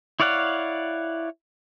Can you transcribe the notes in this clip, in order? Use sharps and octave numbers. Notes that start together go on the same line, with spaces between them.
E4 C#5 D5 F5 F#5